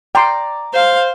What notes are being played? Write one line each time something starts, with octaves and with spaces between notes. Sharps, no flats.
D5 G5 A#5 C6
C5 F5